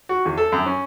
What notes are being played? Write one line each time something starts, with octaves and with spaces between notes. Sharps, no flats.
F#4
E2
A4
F#2
C#4